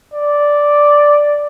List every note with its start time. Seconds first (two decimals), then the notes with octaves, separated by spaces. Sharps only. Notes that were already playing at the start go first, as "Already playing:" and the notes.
0.14 D5